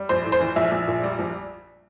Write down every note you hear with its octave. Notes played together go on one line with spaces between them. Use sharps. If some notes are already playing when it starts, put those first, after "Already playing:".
Already playing: G3
A#1 C5
A2
C5
E3
A#1 E5
A#1
A#2
G3
A#1